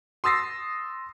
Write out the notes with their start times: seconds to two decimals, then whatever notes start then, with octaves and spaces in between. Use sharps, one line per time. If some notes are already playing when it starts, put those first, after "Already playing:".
0.24 C6 D#6 E6 A6 A#6 C7